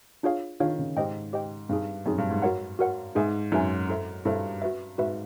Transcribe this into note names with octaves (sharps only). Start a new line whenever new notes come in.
D4 F4 G#4 C#5 F5
D#3 D4 F4 G#4 C#5 F5
C#3
G#2 G4 C5 D#5 G5
G4 C5 D#5 G5
G2 C4 D#4 G#4
F#2 C4 D#4 G#4
G2
G#2
F#4 A#4 C#5 F#5
F#4 A#4 C#5 F#5
G#2 D#4 G#4 B4 E5 G#5
F#2 D#4 G#4 B4 E5 G#5
E4 A4 C5 E5
G2 E4 A4 C5 E5
F#4 B4 E5
G#2 F#4 B4 E5